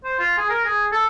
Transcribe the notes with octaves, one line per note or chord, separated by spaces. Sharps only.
C5
F4
G#4
A#4
G#4
A4